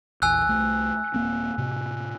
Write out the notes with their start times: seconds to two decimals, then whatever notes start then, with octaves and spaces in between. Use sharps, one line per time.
0.22 A#1 E2 G#5 E6 F#6
0.47 C2 A3
1.14 D#1 A#3 C4
1.58 A2 C3